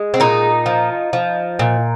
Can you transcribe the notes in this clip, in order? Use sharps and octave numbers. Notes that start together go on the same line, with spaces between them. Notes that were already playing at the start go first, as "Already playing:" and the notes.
Already playing: G#3
C4
A#2 D#4
F3
F3
A#2